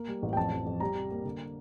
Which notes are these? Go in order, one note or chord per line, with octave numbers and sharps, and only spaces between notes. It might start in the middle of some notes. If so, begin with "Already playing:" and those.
Already playing: A#3
G3
A1
G5
F2 A5
F2
F2
G3 A#5
C3
A#3
D3